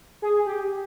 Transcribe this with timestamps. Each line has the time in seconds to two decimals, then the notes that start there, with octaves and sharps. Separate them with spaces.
0.22 G#4
0.46 G4